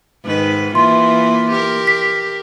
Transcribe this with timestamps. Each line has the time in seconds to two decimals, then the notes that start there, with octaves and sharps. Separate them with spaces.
0.24 G#2 D#3 B4
0.75 E3 A#3 F4 C6
1.51 G4 A#4
1.87 B6